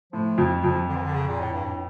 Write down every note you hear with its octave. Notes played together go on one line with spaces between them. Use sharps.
A2 F3
F2
F2 F3
D3
E3
D3
C#3
A#2
A2
G2
A2